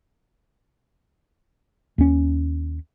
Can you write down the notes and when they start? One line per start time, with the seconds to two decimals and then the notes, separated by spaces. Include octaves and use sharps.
1.98 D#2 C#4